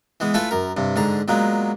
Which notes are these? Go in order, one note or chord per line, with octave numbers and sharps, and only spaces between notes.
E3 G#3 B3
A3 E4 F4 A4 B4 G#5
F#2 A#4
G2 C3
G#2 D3 G#4 A#5
A#2 F#3 G#3 A#3 B3